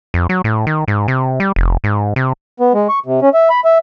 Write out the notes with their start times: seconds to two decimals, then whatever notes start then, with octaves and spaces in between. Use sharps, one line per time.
0.14 F2
0.29 F#3
0.44 A2
0.67 D#3
0.88 G#2
1.08 C3
1.40 G3
1.56 F1
1.84 G#2
2.16 C3
2.60 B3
2.74 G#3
2.89 C#6
3.06 C3
3.22 C#4
3.34 E5
3.50 B5
3.65 E5